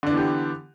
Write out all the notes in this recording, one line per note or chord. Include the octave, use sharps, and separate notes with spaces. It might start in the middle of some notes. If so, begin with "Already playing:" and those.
D3 E3 B3 D4 G4